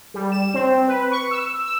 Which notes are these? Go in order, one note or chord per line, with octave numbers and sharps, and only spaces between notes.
G3
E7
C4
B4
C#6
E6
E6